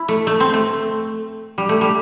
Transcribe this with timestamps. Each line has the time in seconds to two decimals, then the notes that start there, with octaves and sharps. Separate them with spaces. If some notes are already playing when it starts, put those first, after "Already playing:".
Already playing: E4
0.08 A3
0.27 A3
0.40 C4
0.54 A3
1.58 G3
1.69 A3
1.81 G3